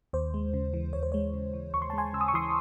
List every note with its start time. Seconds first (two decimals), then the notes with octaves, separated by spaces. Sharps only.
0.13 D#2 C5
0.34 G#3
0.53 C#3
0.74 E3
0.93 D#2 C#5
1.03 C5
1.12 G#3 C#5
1.33 C#3
1.53 E3
1.74 D#2 C#6
1.82 C6
1.90 A5
1.93 G#3 G#5 C6
2.13 C#3 E6
2.21 D#6
2.28 C#6
2.34 E3 C6 D#6